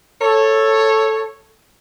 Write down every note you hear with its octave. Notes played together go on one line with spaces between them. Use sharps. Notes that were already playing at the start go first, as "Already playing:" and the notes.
A4 C#5